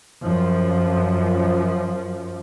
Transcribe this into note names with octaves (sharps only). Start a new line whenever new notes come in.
F#2 F3